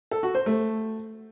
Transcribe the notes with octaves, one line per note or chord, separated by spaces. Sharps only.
A4
F#4
C5
A3